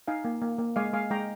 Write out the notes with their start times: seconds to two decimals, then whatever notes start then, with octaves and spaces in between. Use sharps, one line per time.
0.08 D#4 F5 G#5
0.25 A#3
0.42 A#3
0.59 A#3
0.76 G#3 F5 G#5
0.93 G#3 F5 G#5
1.10 G#3 G5 A#5